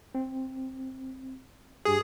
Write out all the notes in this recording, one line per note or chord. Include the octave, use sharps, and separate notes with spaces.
C4
G2 G4 G#4 G#5